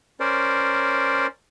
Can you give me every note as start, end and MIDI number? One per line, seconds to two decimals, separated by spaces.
0.20 1.27 61
0.20 1.27 70
0.20 1.27 72
0.20 1.27 74